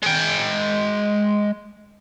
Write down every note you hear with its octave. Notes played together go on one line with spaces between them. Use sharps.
G#3 G5